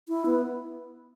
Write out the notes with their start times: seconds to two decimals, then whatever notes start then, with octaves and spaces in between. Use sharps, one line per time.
0.08 E4
0.26 B3